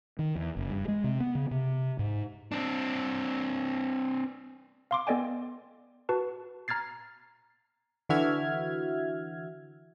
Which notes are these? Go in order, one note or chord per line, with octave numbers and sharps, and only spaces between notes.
D#3
E2
F#1
G2
G#3
C3
B3
C#3
C3
G#2
C4 D4
F5 C6 D6
B3 A4 D5 D#5 G5 G#5
F#4 B4 A5
A#5 F6 G#6 A6 C7
D3 E3 F#4 E5 F6 G#6